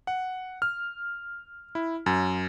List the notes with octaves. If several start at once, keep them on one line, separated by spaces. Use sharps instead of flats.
F#5
F6
E4
F#2